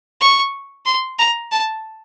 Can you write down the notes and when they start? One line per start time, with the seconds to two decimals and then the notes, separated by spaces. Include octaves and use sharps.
0.21 C#6
0.86 C6
1.19 A#5
1.51 A5